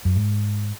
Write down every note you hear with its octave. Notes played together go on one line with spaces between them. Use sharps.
F#2
G#2